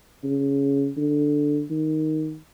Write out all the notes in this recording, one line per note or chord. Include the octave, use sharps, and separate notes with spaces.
C#3
D3
D#3